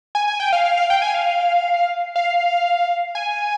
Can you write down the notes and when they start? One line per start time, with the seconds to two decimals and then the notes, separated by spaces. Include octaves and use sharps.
0.15 G#5
0.28 G#5
0.40 G5
0.53 F5
0.65 F5
0.77 F5
0.90 G5
1.02 G#5
1.15 F5
2.16 F5
3.15 G#5